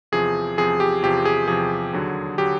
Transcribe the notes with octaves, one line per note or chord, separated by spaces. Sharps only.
E2 C3 F3 G#4
E2 C3 F3 G#4
G4
E2 C3 F3 G4
G#4
E2 C3 F3 G#4
D#2 D3 F#3
D3 F#3 G4